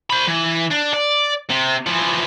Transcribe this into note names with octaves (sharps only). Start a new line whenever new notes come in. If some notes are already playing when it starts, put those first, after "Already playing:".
C5 B5
E3
D4
D5
C3
E3 F3